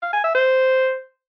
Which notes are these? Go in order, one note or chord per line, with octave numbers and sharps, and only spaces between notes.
F5
G#5
E5
C5